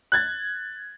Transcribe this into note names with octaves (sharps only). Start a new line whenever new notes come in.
F#6 G#6 A6